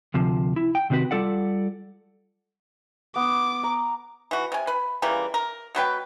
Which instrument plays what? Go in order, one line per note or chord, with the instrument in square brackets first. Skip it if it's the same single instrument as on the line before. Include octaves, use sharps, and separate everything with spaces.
[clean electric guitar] D2 C3 F3
E4
G5
C3 D#3 C4 F#4 B4
G3 F4 A4 D5 F#5
[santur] B3 [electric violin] D6
[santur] A#5
[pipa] E3 F#4
C3 G#5
B4 B5
C#3 E3 G3 A#3
A#4
B2 F#3 B4 G5